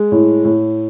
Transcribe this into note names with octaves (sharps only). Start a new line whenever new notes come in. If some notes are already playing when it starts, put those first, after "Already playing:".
Already playing: G#3
A2
A2